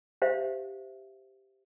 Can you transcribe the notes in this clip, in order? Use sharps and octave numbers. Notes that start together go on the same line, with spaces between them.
G4 C5 E5 F5